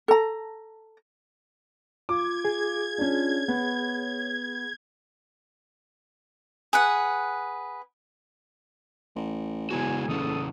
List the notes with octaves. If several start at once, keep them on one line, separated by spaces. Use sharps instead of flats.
A4 A#5
F4 D6 G#6
G#4
C#4 D4
B3 C#5
G#4 B4 F#5
A1
E2 C#3 G#3 F#4 G#5
F#1 C#3 E3 C#4 A4 D#6